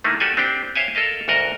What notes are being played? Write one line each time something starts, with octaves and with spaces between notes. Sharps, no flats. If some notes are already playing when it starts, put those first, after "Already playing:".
D#3 A3 A#3 D#4 E4
F#4 G4 A4 D5 G5 G#5
C4 D4 G4 G5
C5 C#5 E5 F5 G5 G#5
A4 A#4 D#5 F5
D2 G#2 F#4 A#4 D#5 F#5